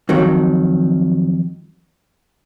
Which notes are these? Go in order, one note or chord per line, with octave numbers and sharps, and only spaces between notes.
F2 D#3 F#3